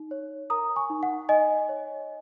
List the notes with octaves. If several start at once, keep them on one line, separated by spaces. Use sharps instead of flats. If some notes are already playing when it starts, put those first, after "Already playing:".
Already playing: D#4
C#5
A#4 A#5 D#6
G#5 C#6
D#4
F#5
D#4 D#5 G#5
C#5